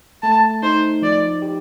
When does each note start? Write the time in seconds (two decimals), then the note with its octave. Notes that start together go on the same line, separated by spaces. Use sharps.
0.23 A3 A5
0.63 D#4 C5
1.02 F3 D5
1.42 G4